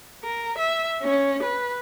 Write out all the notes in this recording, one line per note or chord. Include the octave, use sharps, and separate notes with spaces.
A#4
E5
C#4
B4